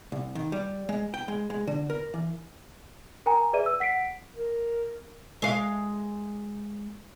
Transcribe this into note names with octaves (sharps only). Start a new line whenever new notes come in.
C2
D#3
G3
G#3
G5
G#3
G#3
D3
A#4
E3
A#4 G5 G#5 A#5
G#4 B4 D5 E5 D#7
E6
F#5 B6 C7 D7
A#4
G#3 F5